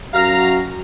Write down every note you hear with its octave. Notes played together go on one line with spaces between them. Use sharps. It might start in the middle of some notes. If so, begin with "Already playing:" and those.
F#2 F#4 F5 A#5